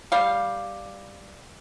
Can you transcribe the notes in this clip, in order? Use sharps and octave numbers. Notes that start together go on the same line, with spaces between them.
G3 F5